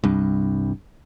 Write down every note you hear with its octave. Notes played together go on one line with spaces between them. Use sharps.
C2 G2